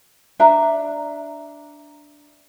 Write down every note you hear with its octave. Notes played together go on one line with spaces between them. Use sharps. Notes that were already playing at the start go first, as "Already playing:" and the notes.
D4 E5 A#5